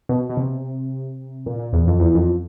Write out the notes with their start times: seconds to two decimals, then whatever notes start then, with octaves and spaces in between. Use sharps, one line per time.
0.09 B2
0.30 B2
0.37 C3
1.46 A#2
1.59 A#2
1.73 E2
1.87 F2
2.00 E2
2.15 F2